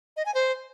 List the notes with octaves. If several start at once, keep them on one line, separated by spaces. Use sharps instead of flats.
D#5
G#5
C5